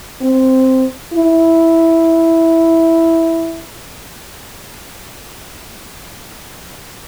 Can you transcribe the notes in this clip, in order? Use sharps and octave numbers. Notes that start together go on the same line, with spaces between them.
C4
E4